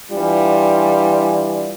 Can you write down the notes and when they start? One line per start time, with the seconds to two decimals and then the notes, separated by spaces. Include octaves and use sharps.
0.11 E3 G3 D4 F4